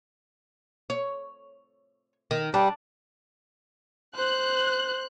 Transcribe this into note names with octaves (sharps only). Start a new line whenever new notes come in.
C#5
D#3
G3 D4
C5 F#6